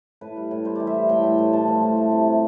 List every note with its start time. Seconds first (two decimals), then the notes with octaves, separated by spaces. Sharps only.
0.21 A2 B4
0.36 G3
0.51 A2
0.65 G3 C5
0.76 E3 D5
0.87 E5
0.94 G3
1.09 A2 G5
1.24 A2
1.38 A2
1.53 A2 A5
1.68 F3
1.82 A2
1.97 A3
2.11 C3
2.26 C3